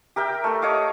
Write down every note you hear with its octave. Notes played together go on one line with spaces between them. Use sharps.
G4 A#4 E5 G5
A3 A4
C#5 D#5 F5 D6